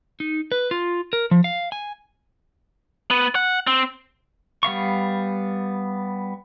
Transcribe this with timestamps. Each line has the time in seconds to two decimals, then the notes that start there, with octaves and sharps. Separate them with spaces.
0.20 D#4
0.52 B4
0.71 F4
1.13 A#4
1.31 F3
1.44 F5
1.72 G#5
3.10 B3
3.35 F#5
3.67 C4
4.63 G3 B3 F5 C#6